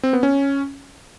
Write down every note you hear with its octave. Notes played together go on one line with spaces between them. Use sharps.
C4
B3
C#4